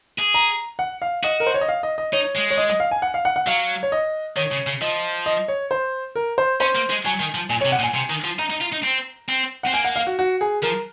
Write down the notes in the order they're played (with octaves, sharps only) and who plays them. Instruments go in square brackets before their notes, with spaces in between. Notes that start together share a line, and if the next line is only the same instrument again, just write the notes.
[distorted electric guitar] G#4
[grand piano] A#5
F#5
F5
[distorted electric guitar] F#4 [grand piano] D#5
[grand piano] A#4
C5
C#5
D#5
F5
D#5
D#5
[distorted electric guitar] D#4 [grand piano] C#5
[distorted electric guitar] G#3
[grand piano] C#5
D#5
D#5
F5
G#5
F#5
F5
F#5
F#5
[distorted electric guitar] F#3 [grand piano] F5
[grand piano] C#5
D#5
[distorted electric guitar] D#3 [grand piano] C#5
[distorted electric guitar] C#3
C#3
[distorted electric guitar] F3 [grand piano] D#5
[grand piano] D#5
C#5
C5
A#4
C5
[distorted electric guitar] C#4 [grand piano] C5
[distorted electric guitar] A#3
G#3
[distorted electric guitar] F#3 [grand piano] G#5
[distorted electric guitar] D#3
F3
[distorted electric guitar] A#2 [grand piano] G#5
[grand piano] C#5
[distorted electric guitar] C3
[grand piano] F#5
[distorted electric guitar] A#2
[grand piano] G#5
[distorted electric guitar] C3
D#3
F3
[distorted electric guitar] D#4 [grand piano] A#5
[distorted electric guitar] D#4
F4
D#4
C4
C4
[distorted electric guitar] C4 [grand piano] F#5
[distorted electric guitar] A#3 [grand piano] G#5
[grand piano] F#5
F5
F#4
F#4
G#4
[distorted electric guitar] F3 [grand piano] A#4